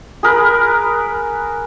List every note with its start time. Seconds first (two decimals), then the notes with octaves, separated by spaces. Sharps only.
0.23 G#4 A#4 B4